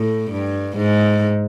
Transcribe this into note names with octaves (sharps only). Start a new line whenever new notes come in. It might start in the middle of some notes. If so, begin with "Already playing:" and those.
Already playing: A2
G2
G#2